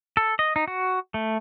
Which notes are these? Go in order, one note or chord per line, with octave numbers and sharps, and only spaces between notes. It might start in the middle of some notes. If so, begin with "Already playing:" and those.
A4
D#5
D#4
F#4
A3